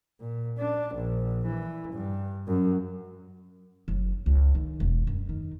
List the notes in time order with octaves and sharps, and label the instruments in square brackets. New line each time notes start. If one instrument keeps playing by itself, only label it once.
[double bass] A#2
D4
A#1
E3
G2
F#2
[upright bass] F#1
C#2
D#3
E1
F#2
D#3